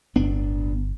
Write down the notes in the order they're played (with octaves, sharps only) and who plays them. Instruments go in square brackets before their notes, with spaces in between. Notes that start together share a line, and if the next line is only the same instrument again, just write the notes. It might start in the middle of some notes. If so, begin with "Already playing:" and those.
[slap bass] D1 B3 D4 [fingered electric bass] G1